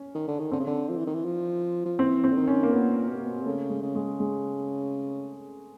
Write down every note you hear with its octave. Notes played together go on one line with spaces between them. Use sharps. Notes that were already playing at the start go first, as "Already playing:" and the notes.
Already playing: C#4
D#3
D3
D#3
D3 C4
C#3
D3
F3
E3
D#3
E3
F3
F3
E3 C4
C4
D3
D#3
C#4
A#3
A#2 B3
B2 A#3
C3
B2
C3
C#3 A3
G#3
C#3
G#3
G#3